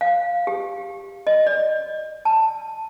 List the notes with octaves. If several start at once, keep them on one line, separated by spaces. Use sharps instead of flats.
F5
G4
D#5
D5
A5